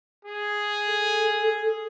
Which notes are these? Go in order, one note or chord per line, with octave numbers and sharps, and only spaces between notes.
G#4
A4